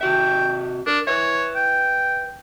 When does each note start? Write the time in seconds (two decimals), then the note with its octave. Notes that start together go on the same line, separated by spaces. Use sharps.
0.01 C3 F#4 E5 G5
0.87 D4 A#4
1.07 B4 C#5 E5
1.56 G5